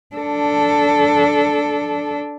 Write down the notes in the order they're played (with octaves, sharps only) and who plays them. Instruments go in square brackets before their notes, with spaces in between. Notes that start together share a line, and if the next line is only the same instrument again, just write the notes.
[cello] D4 A4